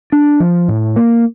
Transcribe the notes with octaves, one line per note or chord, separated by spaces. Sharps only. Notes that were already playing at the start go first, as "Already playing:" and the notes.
D4
F3
A2
A#3